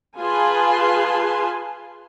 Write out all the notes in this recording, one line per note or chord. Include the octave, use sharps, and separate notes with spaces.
F4 G#4 B4 G#5 A5 C6